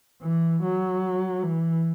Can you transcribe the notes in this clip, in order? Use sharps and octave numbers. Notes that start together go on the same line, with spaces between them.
E3
F#3
E3